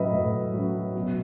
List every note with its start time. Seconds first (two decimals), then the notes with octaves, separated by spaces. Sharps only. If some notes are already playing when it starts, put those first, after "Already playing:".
Already playing: A2 F#3 C#4 B4 D#5 E5
0.13 A2
0.53 F#3 C#4
0.95 B2